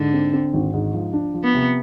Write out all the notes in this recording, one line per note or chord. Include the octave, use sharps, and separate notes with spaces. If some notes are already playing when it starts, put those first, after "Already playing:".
Already playing: G#2 D3
C4
C4
G#1
G#2
F3
D4
F3
B3
C3